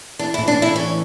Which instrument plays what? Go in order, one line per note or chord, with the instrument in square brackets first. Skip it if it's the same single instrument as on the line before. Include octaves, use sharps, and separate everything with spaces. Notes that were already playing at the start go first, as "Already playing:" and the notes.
[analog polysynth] E3 [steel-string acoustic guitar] D4
[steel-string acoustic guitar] E4
[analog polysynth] A2
[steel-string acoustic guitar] D4
[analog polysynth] E3
[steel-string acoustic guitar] E4
[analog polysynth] A2 [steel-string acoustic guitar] C#4